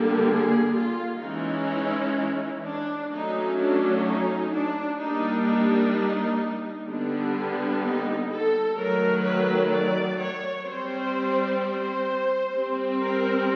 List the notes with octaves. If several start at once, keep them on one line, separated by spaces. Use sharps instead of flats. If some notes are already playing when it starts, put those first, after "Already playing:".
Already playing: D3 G3 A#3
G#4
F4
E3 G#3 C#4 D#4
D4
F#3 A3 C#4 D#4
D4
D#4
D4
G3 A#3 D4 D#4
D#4
D3 G3 B3 D4
D#4
A4
D#3 F#3 A3 A#4
B4
D5
C#5
G3 C4 C5
C5
G3 C4
A#4